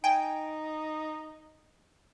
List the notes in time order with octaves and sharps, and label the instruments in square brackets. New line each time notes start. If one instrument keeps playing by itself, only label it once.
[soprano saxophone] D#4 [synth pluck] G5 G#5